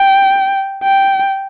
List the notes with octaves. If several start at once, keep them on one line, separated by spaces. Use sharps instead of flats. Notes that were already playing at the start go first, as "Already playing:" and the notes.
Already playing: G5
G5